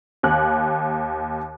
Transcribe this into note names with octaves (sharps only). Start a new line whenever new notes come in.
D#2 F#6